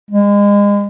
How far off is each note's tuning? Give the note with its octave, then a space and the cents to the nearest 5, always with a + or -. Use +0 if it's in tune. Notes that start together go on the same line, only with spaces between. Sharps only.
G#3 -35